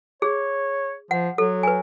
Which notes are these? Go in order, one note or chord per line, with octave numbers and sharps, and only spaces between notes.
G#4 C#5
F3 F#5
F#3 A4
B4 G#5